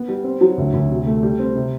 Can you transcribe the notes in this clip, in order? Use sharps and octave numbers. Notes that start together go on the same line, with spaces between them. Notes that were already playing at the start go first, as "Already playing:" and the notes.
Already playing: B3
G3
C4
F#3
D2
D2
C3
A3
G3
C4
C3